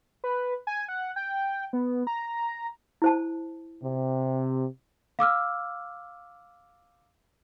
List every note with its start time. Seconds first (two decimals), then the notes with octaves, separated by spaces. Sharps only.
0.24 B4
0.67 G#5
0.88 F#5
1.16 G5
1.73 B3
2.07 A#5
3.02 E4 C5 A5
3.82 C3
5.19 F5 D6 E6 F6